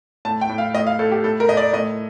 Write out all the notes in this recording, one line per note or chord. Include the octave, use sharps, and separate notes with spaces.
A2 A5
G5
A2
F5
A2 D#5
F5
A2 A4
G4
A2 A4
A#4
A2 D#5
D5
A2 D#5